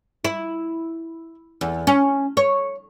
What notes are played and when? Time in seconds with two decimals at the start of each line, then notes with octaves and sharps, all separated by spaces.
0.24 E4
1.61 E2
1.87 C#4
2.37 C#5